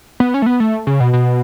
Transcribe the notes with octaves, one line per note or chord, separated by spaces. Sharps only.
B3
C#4
A3
B3
A3
C#3
B2
B2